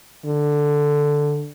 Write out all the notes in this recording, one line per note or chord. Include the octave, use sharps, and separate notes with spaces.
D3